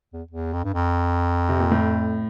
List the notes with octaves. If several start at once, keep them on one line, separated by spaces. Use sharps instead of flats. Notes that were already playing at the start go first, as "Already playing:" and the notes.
E2
E2
F2
G2
F2
C3
A#2
A2